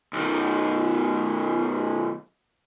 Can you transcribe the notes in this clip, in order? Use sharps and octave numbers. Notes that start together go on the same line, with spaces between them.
B1 D#3